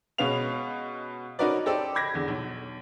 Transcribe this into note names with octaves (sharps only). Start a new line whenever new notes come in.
B2 G#3 C#4 B4 F5 F7
C#4 D#4 F#4 A#4 B4 D5
G4 A4 C5 D5 D#5
B5 D6 G#6 A#6
E2 D3
B1